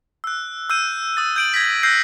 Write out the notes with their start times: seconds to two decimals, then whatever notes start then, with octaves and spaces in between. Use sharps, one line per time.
0.24 E6 F#6
0.70 E6 G6 D#7
1.17 D#6 A6
1.36 G6 D7 F#7
1.54 G#6 A#6 B6
1.83 E6 F#6 G6 A#6 C7 D7